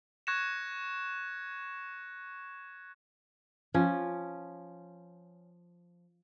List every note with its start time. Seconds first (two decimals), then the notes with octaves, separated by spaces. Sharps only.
0.27 C#6 F#6 G#6 A#6 C#7 E7
3.74 F3 C#4